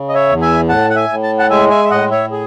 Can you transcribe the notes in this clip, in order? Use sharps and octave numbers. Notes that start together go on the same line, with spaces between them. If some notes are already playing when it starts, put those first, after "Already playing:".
Already playing: C#3
D#5
C#5 E5
E2
E5 G#5
A2 F#5 A5
F#5
E5 G#5
A2
A5
F#5 A5
G#3 E5 G#5
E5 G#5
E5
A2 D#5 F#5
C#5 E5
G#4